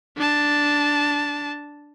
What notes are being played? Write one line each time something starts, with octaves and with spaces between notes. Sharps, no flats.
D4 A5